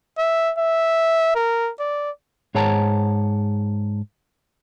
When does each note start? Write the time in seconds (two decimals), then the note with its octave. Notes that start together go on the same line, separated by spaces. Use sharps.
0.18 E5
0.58 E5
1.35 A#4
1.80 D5
2.55 G#2 G#4 C#5 F#5 A5 A#5